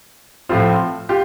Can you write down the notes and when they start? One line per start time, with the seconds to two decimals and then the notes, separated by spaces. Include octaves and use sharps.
0.49 A2 F3 C4 F4
1.09 F4 G4